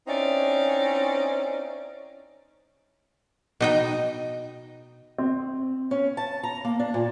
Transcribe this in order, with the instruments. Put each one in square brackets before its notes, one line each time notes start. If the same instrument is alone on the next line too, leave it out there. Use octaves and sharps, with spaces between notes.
[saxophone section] C4 C#4 D#4 E4 D5
[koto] B2 D#4 G5
[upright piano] C4
[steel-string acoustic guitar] C#4
A5
A#5
A#3
D4
A#2